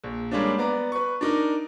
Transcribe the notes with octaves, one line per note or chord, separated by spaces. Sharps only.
A#1
G3 G#3 A#3 C#4 D4
B3 D5 A#5
B4 C#6
D4 D#4 A#4